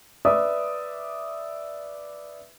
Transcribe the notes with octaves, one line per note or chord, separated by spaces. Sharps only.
B4 D5 E5 D#6